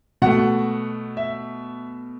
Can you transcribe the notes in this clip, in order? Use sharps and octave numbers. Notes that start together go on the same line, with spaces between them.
B2 A3 F#5
E5